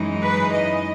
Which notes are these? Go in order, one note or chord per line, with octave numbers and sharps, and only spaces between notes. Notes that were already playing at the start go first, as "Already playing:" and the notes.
Already playing: F#2 E3 G#3 D#4
B4
D#5